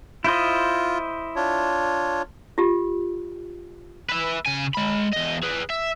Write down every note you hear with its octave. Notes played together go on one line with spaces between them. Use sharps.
E4 F4 C5 D#5
D4 F4 C#5
F4 G4
B4 E5
C#3 G#5
G#3 B5
E2 D#5
G#4 B4
E5